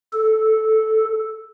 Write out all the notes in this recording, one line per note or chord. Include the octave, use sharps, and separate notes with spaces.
A4